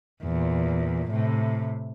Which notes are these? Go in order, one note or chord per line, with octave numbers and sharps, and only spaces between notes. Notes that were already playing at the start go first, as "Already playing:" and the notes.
E2 A#2
A2 C3